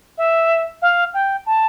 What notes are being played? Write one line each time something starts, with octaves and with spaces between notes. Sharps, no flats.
E5
F5
G5
A5